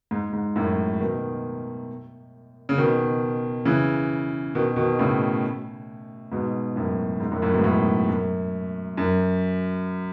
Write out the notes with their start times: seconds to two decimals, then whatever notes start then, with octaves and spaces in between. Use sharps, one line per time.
0.11 G#2
0.33 G#2
0.56 F#2 A2
1.00 B2 D#3
2.69 C#3
2.78 B2 D#3
3.65 C#3 E3
4.55 B2 D#3
4.76 B2 D#3
4.99 A2 C#3
6.32 G#2 B2
6.76 F#2 A2
7.20 G#2
7.32 F#2 A2
7.42 F#2 A2
7.54 G#2 B2
7.64 F#2 A2
8.09 F#2
8.97 F#2